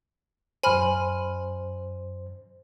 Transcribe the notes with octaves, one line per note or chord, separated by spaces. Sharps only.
F#2 C5 G#5 B5 F6